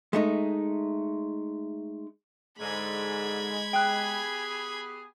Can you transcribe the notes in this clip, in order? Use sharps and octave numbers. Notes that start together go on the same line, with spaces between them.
G#3 A3 D#4
G#2 D3 G#3 B5 G#6
B3 G4 G#4 G5 F#6